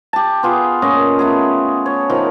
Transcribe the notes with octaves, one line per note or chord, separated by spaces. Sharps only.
G4 A5
B3 F4 G#4
A#2 C#4 D#5
A3 B3 G#4
C#5
D#3 F3